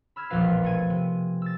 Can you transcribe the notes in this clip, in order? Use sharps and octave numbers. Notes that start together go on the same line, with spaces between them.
B5 E6 F6 G#6
E1 A#1 E2 F3 B4 F5
A3 G#5 D#7
C3
E6 A6